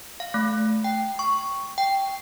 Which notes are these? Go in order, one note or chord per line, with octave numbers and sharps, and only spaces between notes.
F5
A3
G5
C#6
G5